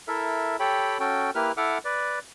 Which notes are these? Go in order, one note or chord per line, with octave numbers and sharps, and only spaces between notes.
E4 A4 A#4 E5
G4 A4 C#5 G5 B5
C#4 F#4 A4 G5
A#3 E4 G4 A#4 B4 F6
E4 A4 E5 F#5 D6 F6
B4 D5